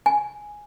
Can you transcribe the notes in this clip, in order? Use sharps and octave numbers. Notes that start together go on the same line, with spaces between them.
G#5